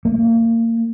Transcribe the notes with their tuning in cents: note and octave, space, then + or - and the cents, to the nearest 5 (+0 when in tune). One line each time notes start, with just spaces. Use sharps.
A#3 -30